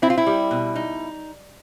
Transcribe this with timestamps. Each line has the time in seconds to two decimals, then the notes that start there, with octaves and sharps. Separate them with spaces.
0.02 C4 E4
0.10 F4
0.18 E4
0.27 G3
0.51 B2
0.75 D#4